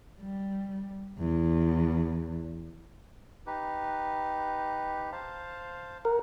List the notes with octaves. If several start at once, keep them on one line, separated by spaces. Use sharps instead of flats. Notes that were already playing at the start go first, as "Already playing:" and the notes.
G3
E2
D#4 G4 B4
C5 F5 A5
A#4 F#5